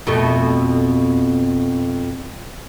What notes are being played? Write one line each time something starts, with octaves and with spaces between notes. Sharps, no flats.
F2 B2 A3